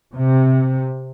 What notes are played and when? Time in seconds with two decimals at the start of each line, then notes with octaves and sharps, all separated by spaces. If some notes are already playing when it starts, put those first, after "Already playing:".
0.15 C3